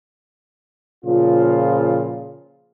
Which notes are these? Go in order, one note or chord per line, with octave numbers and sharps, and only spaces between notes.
A#2 C#3 F3 F4